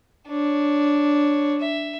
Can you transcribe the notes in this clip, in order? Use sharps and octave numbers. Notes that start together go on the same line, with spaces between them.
D4 C#5
E5